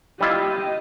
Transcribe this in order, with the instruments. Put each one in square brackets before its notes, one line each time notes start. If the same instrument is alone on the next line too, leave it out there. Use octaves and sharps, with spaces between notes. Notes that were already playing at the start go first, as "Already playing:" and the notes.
[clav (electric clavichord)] G3 E4 F4 [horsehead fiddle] G4 D#5